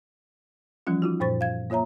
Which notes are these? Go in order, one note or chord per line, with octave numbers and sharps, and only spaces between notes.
E3 F3 G3 C#4 F4
D#4 F4 F#4
F#2 A#2 C5 C#6 A6
F5 G#6
A#3 F4 C#5 E5 A#5